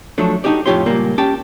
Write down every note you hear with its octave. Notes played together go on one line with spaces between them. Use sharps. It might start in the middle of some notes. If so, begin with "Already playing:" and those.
F3 F#3 A3 D4
D4 D#4 F#4 G4 D5
F2 A2 F4 G4 C#5 C6
C#2 A#2 G3 A#3
C#4 G4 G5 A5